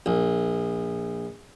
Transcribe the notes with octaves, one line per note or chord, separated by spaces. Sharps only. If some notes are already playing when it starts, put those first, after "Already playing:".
A#1